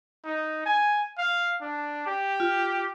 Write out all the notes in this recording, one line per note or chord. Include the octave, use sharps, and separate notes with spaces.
D#4
G#5
F5
D4
G4
F4